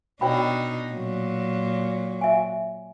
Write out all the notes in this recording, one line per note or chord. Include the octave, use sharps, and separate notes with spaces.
B2 D4 D#4 C#5 G5 B5
A#2 F#3
E5 G#5